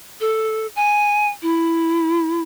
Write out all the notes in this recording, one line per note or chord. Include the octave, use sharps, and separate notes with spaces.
A4
G#5
E4